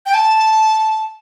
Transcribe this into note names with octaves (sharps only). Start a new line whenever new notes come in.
G5
A5